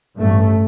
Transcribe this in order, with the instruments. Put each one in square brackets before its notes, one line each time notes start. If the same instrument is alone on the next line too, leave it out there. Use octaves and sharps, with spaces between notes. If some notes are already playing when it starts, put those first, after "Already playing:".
[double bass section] A1 G2 A3